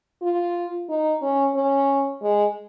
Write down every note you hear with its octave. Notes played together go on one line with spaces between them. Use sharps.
F4
D#4
C#4
C#4
G#3